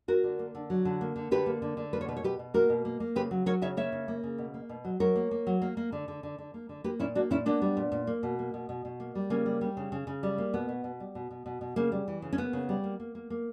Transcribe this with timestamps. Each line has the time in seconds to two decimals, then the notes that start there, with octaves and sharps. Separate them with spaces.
0.08 A#3 F#4 A#4
0.24 D3
0.39 A#3
0.55 D3
0.70 F#3
0.85 D3
1.01 A#3
1.16 D3
1.31 D3 G4 B4
1.46 A#3
1.62 D3
1.77 D3
1.93 A#3 B4
2.01 C#5
2.08 B2 B4
2.17 C#5
2.23 B2 G4 B4
2.39 B2
2.54 A#3 F#4 A#4
2.70 B2
2.85 A#3
3.00 A#3
3.15 C#3 G4 B4
3.31 F#3
3.46 F#3 A#4 C#5
3.62 C#3 C#5 E5
3.77 A#3 C#5 E5
3.92 C#3
4.08 A#3
4.23 C#3
4.38 B2
4.54 A#3
4.69 B2
4.85 F#3
5.00 F#3 A#4 C#5
5.16 A#3
5.31 A#3
5.47 F#3
5.62 A#3
5.77 A#3
5.92 D3
6.08 D3
6.23 D3
6.38 D3
6.54 A#3
6.69 D3
6.84 A#3 G4 B4
6.99 A#2 C#4 E4
7.15 A#3 D4 F#4
7.30 A#2 C#4 E4
7.46 A#3 B3 D4
7.62 G3
7.77 A#2
7.92 A#2
8.07 A#3
8.23 B2
8.39 A#3
8.54 B2
8.69 B2
8.85 B2
9.00 A#3
9.15 G3
9.30 C#3 A#3 C#4
9.46 G3
9.61 G3
9.77 C#3
9.92 C#3
10.07 C#3
10.23 G3
10.38 A#3
10.54 B2 B3
10.69 B2
10.84 B2
11.00 G3
11.15 B2
11.31 B2
11.46 B2
11.61 B2
11.76 C#3 A#3
11.92 G3
12.08 E3
12.22 C#3
12.33 C#4
12.38 A#3 B3
12.53 C#3
12.69 G3
12.84 A#3
13.00 A#3
13.15 A#3
13.30 A#3